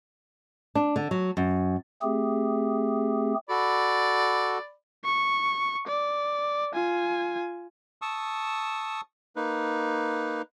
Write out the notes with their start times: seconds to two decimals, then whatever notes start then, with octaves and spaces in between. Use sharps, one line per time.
0.75 D4
0.96 D3
1.11 F#3
1.37 F#2
2.02 A3 C4 G4 G#4
3.50 F#4 A4 D5 B5
5.05 C#6
5.87 D5
6.74 F4 G#5
8.02 A5 C#6 D#6 E6
9.36 A#3 D#4 B4